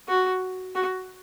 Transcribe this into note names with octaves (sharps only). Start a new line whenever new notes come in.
F#4
F#4